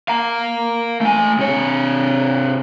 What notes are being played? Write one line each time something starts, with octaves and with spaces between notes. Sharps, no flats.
F5 A#5
A3 G#5
C3 C#5